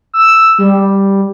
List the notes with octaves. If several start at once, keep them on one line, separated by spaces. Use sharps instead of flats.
E6
G3